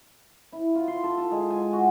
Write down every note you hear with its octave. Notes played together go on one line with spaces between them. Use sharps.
E4
F4
C6
A4
A4
G#3
G#5
F#4